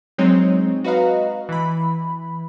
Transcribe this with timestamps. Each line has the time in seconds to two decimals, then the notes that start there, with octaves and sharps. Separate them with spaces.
0.18 F#3 G#3 C4 D#4 C#5
0.84 F#4 B4 D#5 F5 A#5
1.49 E3 B5